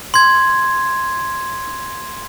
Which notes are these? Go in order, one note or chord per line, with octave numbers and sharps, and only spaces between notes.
C6 G#6